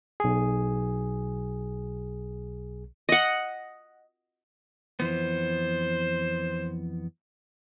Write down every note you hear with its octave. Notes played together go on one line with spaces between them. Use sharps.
B1 G#4
D#5 F#5
F2 E3 B3 C5